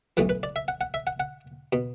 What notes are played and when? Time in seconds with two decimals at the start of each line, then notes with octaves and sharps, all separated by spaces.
0.17 B1 A2 E3 B4
0.29 B4
0.43 D5
0.56 E5
0.68 F#5
0.81 F#5
0.94 E5
1.07 F#5
1.20 F#5
1.73 B2